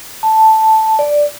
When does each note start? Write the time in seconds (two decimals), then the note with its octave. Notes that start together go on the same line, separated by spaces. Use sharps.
0.23 A5
0.99 D5